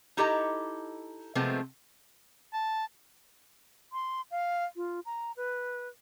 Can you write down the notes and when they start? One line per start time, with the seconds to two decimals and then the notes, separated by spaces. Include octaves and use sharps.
0.17 D#4 E4 G4 A4 D#5 A#5
1.35 C3 F3 G#3 A3 B3 C4
2.54 A5
3.93 C6
4.31 F5
4.76 F4
5.05 A#5
5.37 B4